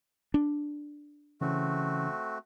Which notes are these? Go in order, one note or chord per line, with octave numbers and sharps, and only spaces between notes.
D4
C#3 E3 A3 C4 C#4 F#4